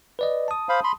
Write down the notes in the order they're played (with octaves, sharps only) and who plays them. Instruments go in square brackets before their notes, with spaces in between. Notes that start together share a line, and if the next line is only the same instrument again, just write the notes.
[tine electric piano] B4 D5 D#5
A5 D#6
[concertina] C5 F5 B5
B5 C6